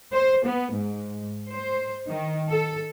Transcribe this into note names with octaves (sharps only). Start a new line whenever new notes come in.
C5
B3
G#2
C5
D#3
A4